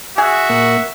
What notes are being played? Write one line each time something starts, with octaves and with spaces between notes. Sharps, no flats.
F#4 G#4 E5
A#2 A#3